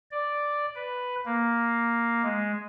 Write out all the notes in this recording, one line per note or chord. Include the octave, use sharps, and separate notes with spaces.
D5
B4
A#3
G#3